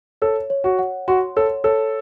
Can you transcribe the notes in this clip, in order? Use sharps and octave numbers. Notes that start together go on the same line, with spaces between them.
A4 C#5
C#5
F#4
F#5
F#4 C6
A4 C#5
A4 C#5